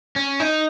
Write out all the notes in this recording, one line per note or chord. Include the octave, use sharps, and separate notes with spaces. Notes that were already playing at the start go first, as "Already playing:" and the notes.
C#4
D#4